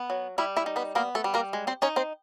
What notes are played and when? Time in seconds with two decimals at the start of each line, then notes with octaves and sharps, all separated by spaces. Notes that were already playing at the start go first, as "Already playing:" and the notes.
Already playing: B3
0.10 F#3
0.38 G3 E4 E5
0.57 E4 E5
0.66 D#4
0.76 B3 B4
0.95 A#3 B3 A#4
1.15 A3 A4
1.24 G3
1.34 A#3 A#4
1.53 G#3
1.67 C4 C5
1.82 C#4 D#4 C#5
1.96 C4 C5